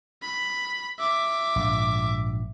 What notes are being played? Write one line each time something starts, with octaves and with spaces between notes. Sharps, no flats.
B5
E5 D6
A#1 G#2